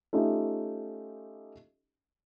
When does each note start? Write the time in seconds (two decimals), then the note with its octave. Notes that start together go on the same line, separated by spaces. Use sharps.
0.13 A3 C#4 D#4 F4 G4